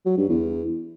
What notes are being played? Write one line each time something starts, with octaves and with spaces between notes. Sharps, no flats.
F#3
G2
E2